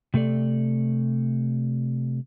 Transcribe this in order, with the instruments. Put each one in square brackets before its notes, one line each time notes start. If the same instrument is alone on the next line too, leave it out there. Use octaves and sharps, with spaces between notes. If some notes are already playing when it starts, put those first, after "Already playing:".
[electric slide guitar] C3 A3 A4 D5